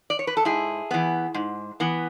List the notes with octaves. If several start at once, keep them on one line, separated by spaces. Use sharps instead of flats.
D5
C#5
B4
A4
G#2 E4 G#4
E3 B3
G#2
E3 B3